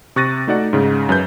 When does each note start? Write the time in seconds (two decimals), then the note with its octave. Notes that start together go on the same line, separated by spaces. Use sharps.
0.16 C3 C#6 F#6 A6 A#6 D#7
0.47 A3 D#4 F#4 D5 F#5
0.73 G#2 C#3
1.09 F#2 B4 G6